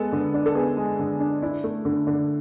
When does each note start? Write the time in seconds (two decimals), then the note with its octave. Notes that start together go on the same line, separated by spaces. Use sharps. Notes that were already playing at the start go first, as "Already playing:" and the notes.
Already playing: G#3 B3 A4
0.12 D3
0.34 D4
0.46 A4
0.55 B3 G#4
0.77 G#3
0.99 D3
1.20 D4
1.42 D4 E4
1.64 A3
1.85 D3
2.07 D3